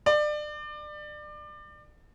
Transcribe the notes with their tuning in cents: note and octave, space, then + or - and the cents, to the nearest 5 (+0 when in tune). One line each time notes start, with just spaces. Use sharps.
D5 +30